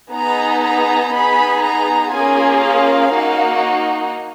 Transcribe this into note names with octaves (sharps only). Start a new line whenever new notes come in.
B3 D#4 G#4 A#5
A#5
B3 D#4 G#4 B5
A#5
A#3 C#4 F4 G#4 G#5
F5
A#3 D#4 F#4